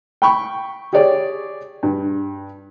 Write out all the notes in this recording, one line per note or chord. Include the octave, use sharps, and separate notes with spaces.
G5 B5 C#6
G4 G#4 C#5 D5
G2